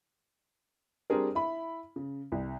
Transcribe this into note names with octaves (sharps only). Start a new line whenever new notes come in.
G3 C4 D4 G#4 A#4
E4 B5
C#3
C2